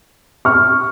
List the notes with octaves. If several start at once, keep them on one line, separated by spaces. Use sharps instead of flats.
C#6 F6